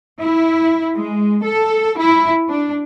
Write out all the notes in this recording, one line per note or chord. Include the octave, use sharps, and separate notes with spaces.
E4
G#3
A4
E4
D4